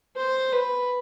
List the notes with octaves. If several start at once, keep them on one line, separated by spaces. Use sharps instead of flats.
C5
B4